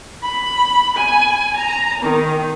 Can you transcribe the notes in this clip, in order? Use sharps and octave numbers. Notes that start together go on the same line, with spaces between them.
B5
G#5
A#5
D#3